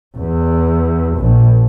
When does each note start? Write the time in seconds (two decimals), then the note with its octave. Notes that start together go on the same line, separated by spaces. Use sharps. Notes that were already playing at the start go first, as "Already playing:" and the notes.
0.17 E2
1.16 A#1